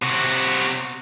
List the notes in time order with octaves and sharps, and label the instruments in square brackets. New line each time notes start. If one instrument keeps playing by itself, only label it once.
[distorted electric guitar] C3 F#4